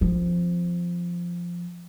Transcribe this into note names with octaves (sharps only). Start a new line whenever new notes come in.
F3 C4